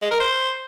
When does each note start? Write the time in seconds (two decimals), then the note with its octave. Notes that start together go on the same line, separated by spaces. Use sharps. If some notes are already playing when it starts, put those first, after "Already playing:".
0.02 G#3
0.11 A#4
0.20 C5